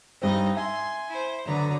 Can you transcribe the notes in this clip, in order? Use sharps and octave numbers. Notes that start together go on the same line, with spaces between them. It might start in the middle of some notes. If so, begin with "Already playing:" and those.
G2 C4 D#4 D#5
E5 G#5 C6
E4 C5
D3 F#3 B3 A#5